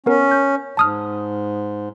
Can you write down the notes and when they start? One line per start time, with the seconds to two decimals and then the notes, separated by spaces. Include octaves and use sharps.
0.06 B3 C#4 A#4
0.31 G6
0.77 G#2 A5 D#6 F6